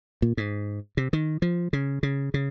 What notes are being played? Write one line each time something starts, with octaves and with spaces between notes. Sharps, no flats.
A#2
G#2
C3
D#3
F3
C#3
C#3
C#3